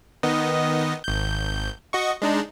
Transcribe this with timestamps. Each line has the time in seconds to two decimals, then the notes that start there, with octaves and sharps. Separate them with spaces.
0.23 D#3 B3 D#5
1.04 G#1 G6
1.93 F#4 D#5 C#6
2.22 G#3 D4 D#4